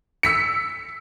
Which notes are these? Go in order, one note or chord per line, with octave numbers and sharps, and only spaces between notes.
E6 B6 C#7